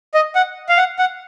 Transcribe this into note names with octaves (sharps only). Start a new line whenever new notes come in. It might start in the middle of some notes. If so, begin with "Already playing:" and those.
D#5
F#5
F5
F#5
F#5